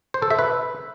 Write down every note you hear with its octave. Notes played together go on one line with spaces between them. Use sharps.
C5
A4
E5
B4